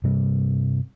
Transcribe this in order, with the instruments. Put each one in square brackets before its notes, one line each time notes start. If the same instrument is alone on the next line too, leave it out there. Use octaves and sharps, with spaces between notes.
[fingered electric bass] G2 C3 G3